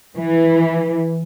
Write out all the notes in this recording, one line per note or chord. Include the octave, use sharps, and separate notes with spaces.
E3